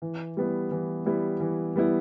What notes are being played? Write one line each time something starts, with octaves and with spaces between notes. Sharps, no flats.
E3
G3 B3 E4
E3
G3 B3 E4
E3
G3 B3 E4